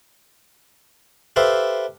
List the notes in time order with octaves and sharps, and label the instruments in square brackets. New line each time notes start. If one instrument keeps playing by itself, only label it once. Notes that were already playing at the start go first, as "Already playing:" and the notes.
[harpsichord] G4 A4 B4 C5 E5 F5